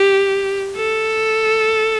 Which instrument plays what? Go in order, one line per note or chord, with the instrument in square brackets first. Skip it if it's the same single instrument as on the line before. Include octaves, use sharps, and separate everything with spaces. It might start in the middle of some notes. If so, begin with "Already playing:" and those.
Already playing: [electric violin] G4
A4